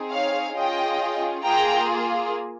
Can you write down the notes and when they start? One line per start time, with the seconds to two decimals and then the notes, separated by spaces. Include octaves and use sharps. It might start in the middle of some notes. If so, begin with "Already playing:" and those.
Already playing: C4 D#4 G#4
0.11 C#5 F5
0.55 C#4 F4 G#4 D#5 G5
1.44 A#3 F4 G#4 G5 A#5